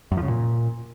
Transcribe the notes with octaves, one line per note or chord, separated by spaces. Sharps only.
F#2
F3
C#3
A#2